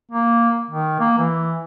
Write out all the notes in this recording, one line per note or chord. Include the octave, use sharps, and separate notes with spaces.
A#3
D#3
A#3
E3